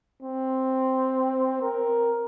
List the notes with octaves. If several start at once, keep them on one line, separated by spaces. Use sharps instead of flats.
C4
A#4